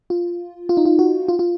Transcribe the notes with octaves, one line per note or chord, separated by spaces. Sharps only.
F4
F4
D#4
F4
F#4
F4
F4